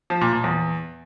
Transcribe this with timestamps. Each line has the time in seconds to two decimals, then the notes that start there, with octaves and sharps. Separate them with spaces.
0.10 F3
0.21 A#2
0.33 A#2
0.44 E2